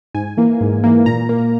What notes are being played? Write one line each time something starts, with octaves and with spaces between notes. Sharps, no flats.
G#2 G#5
E3 A#3
G#2
E3 A#3
A#2 A#5
A#3